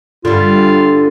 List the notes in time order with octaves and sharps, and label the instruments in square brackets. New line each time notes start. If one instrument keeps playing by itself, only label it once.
[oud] G2 D3 [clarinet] F4